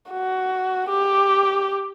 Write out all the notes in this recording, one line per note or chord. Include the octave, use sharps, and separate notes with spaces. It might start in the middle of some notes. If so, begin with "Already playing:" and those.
F#4
G4